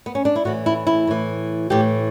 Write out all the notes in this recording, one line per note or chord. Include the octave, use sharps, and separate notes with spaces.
B3
C#4
D4
E4
A2 E3 F#4
E4
E4
A2 E3
A2 E3 G4